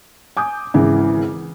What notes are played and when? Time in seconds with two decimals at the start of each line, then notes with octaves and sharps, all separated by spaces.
0.37 G#5 D6 D#6 G6
0.74 G#1 C#3 E3